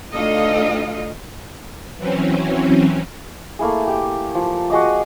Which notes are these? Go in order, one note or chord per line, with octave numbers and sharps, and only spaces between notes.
D2 D#4 F4 A4 D#5 F5
E3 F#3 C4 C#4
A3 A#3 E4 G#4
G4 G5
F3
F#4 G#4 D#5 D6